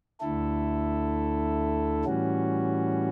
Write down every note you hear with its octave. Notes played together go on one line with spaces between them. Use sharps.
D2 D3 A3 E4 A4
A2 E3 G3 C#4 F#4